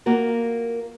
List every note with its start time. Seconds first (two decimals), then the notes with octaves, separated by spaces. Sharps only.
0.06 A#3 F4 F#4 A#4